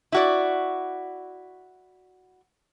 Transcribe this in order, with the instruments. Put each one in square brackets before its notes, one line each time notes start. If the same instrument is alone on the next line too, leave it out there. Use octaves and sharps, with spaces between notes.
[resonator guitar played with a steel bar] E4 F#4 D5